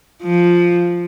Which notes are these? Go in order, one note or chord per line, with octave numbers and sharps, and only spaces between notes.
F3